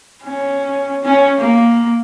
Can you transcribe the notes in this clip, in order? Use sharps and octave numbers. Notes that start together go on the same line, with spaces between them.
C#4
C#4
A#3